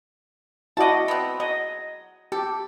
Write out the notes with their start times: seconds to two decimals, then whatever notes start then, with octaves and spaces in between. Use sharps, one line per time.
0.77 E4 F#4 D5 D#5 A5
1.08 B3 C4
1.40 F#3 D#5
2.32 G4 A4